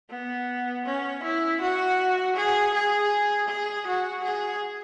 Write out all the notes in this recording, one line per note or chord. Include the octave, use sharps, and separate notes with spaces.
B3
C#4
E4
F#4
G#4
G#4
G#4
F#4
G#4